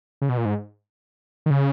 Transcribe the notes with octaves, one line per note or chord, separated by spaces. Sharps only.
C#3
B2
A#2
G#2
D#3
C#3